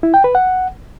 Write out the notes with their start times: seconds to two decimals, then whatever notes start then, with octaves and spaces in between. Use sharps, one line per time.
0.03 E4
0.14 G5
0.24 B4
0.35 F#5